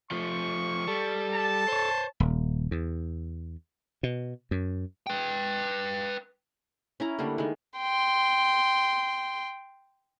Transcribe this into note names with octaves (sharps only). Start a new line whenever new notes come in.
F3 A3 C#6
G3 A4
A5
C5 C#5
D#1
E2
B2
F#2
B4 G5
C#4 E4 A#5
D3 G3 A3 A#3
D#3 G#3
G5 C6